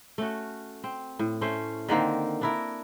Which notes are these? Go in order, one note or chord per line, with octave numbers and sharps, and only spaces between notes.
A3 C#4 F#4
C4
A2
A3 C#4 C5
D3 D#3 A#3 C4
D4 E4 A#4